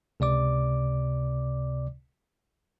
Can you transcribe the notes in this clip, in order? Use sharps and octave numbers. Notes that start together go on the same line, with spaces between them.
C#2 C3 D5 D6